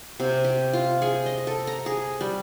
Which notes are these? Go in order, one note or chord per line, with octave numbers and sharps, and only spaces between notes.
C3
G4
F4
G#4
D#5
A4
A#5
G#4
G3